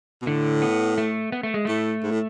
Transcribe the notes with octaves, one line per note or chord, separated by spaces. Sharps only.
B2
A2 D3
B3
A3
B3
A3
G#3
A2 A3
G#2
A2